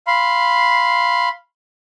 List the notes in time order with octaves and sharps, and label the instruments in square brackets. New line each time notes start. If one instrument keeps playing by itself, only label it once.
[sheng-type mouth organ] F5 B5 C6